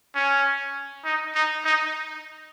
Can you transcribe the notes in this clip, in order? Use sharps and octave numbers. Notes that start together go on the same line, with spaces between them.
C#4
D#4
D#4
D#4